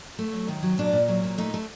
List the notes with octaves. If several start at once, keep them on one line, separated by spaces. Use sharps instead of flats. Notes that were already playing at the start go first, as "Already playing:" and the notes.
A3
F#3
D#3
F#3
A#2 D4
A#2
F#3
A#2
A3 D#4
A3